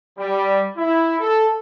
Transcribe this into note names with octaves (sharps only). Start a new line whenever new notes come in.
G3
E4
A4